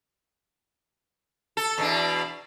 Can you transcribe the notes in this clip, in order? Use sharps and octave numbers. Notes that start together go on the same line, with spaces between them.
A4
E2 B2 D4